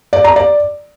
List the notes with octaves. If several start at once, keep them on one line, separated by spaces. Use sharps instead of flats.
D5
A#5
D5